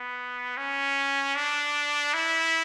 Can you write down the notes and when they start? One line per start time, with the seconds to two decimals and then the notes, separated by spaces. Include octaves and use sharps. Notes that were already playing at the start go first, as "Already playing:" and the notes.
Already playing: B3
0.57 C#4
1.35 D4
2.14 E4